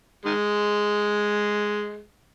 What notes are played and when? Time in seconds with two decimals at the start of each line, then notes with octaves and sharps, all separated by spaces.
0.25 D#3 G#3